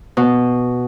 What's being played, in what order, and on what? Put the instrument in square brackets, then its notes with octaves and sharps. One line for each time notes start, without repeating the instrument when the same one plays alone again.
[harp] B2